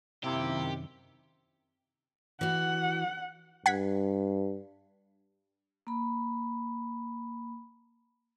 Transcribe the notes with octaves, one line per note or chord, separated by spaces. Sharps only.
F#2 C3 D#3 A#3 E4 G4
E3 F#4 F#5
G2 F#5 G#6 B6
A#3 B5